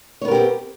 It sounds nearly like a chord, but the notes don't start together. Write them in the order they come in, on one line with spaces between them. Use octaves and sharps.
C#5 B3 A#4 G4 C4